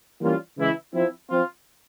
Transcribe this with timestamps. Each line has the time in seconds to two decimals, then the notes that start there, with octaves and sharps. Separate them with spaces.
0.21 E3 G3 A#3 C#4 F4
0.57 C#3 E3 G#3 E4
0.93 F3 C4 E4
1.30 F3 C4 F4